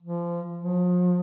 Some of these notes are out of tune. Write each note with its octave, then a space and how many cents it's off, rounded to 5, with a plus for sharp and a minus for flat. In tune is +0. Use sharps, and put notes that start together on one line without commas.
F3 -25
F3 +40